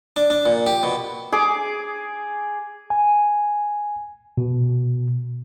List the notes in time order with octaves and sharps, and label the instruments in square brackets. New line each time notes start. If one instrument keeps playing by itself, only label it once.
[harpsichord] D4
D4
A#2
G4
B2
[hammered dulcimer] G#4 D6
[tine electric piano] G#5
B2